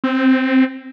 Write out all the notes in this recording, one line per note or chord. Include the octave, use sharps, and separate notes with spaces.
C4